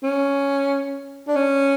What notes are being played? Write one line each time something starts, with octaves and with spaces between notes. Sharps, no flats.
C#4
D4
C#4